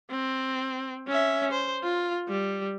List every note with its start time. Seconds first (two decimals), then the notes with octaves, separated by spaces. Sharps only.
0.10 C4
1.07 C#4 E5
1.52 C5
1.83 F4
2.28 G3